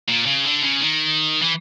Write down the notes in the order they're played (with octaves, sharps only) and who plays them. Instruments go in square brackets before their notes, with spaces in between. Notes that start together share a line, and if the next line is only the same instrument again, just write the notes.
[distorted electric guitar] A#2
C#3
D3
C#3
D#3
E3